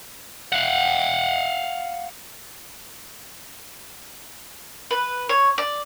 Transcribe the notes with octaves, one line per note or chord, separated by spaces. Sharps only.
F5 F#5
B4
C#5
D5